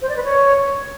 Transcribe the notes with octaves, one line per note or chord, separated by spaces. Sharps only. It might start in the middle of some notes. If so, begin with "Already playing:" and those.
C5
D5
B4
C#5